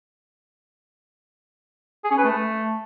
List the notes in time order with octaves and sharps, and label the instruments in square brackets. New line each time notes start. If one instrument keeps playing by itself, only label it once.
[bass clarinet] G#4
C#4
B4
A3